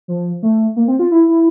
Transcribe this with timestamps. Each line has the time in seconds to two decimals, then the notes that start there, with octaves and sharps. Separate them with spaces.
0.08 F3
0.43 A3
0.76 A#3
0.88 C4
0.99 F4
1.11 E4
1.28 E4